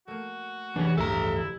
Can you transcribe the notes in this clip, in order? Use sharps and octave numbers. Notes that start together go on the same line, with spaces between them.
A3 A#3 F#4
F1 E3 C#4 D4 G4 G#4
A1 D2 G2 A4 E5 A#5
E4